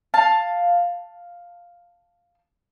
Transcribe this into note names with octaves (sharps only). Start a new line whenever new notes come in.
F5 A5